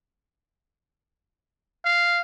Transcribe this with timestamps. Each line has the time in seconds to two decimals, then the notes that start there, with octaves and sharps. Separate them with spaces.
1.85 F5